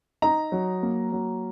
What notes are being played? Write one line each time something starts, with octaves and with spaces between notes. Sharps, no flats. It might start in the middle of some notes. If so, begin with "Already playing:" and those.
D#4 A#5
F#3
A#3
F#3